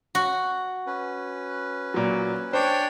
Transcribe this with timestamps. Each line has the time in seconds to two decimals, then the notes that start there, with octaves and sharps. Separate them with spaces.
0.15 F#4
0.86 C#4 B4
1.94 A#2 F#3
2.53 D4 C5 C#5 G5